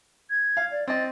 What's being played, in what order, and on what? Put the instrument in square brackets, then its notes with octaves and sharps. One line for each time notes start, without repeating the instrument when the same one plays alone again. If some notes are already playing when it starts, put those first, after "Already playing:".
[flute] G#6
[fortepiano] F5
[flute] D5
[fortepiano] C4 D#5 [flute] A6